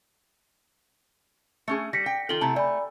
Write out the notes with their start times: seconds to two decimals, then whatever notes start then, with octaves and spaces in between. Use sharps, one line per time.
1.68 A3 C#4 G#4
1.93 G3 A#6 B6 C#7
2.06 G5
2.29 D#3 F4 A4 G5 F#7 G7
2.41 C3 A3 E4 A5 A#5
2.56 A3 D5 G#5 B5